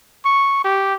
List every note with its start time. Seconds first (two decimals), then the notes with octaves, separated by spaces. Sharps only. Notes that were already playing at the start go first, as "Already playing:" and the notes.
0.25 C#6
0.64 G4